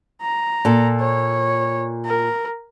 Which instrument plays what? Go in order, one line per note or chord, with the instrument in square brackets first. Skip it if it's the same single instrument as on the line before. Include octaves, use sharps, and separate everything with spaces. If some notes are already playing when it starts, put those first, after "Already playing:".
[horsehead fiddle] A#5
[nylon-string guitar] A#2 A4
[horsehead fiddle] C#5
A#4